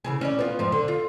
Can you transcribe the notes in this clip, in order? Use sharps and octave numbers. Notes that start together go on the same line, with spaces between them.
C#3 E3 G#4
C#4 D5
B3 F4
F2 G#2 F3
D3
F4